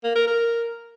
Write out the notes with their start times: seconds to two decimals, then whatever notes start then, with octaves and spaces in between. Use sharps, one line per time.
0.04 A#3
0.16 A#4
0.27 A#4